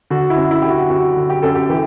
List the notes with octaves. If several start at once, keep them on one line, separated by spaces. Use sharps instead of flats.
D3 F#4
E4
F#2
E4
D3 G4
F#4
F#2 F#4
D3
G4
F#2 A4
G4
E3 G4